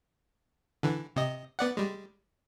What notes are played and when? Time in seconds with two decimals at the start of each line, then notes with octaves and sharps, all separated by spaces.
0.83 D3 E3
1.16 C3 D#5
1.59 B3 D5 F#5
1.77 G3 G#3